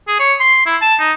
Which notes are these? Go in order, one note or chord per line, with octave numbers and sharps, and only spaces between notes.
G#4
C#5
C6
E4
A5
D#4